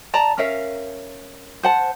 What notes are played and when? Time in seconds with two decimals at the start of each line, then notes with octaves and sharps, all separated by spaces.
0.14 D5 A5 A#5
0.38 C#4 A#4 E5 F5
1.63 C5 F#5 A5